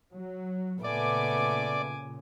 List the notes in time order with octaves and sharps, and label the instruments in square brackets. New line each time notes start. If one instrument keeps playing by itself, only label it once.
[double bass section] F#3
[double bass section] A#2 C#3 [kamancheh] A3 B3 [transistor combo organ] D5 [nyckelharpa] G#5 D6